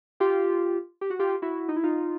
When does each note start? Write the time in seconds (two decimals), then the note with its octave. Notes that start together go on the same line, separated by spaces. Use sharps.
0.20 F4 G4
1.01 G4
1.10 F#4
1.19 F4 G4
1.42 E4 F#4
1.68 D#4
1.76 E4
1.83 D#4 F4